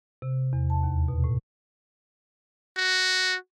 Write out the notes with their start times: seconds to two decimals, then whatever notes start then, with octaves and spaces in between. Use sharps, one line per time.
0.22 C3
0.53 E2
0.70 A5
0.83 D#2
1.08 B2
1.24 A2
2.77 F#4